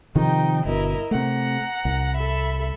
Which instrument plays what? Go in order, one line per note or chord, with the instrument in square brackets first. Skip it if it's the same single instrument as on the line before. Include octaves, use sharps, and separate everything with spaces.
[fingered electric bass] C3 D#3 F3 [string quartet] D#4 G5
[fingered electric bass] G1 B2 [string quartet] E4 A#4 D#5
[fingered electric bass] C3 A3 [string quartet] F#5 A#5
[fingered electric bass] C2
[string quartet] A4 E5 B5